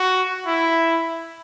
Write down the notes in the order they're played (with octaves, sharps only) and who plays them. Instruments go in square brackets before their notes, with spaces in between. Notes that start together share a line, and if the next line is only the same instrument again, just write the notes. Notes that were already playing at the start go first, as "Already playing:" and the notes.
Already playing: [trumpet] F#4
E4